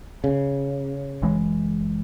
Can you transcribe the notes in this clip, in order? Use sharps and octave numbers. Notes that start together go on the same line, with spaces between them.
C#3
F#1 E3 G#3